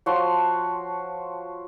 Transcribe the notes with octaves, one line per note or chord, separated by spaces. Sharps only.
F3 F#4 C#5 C6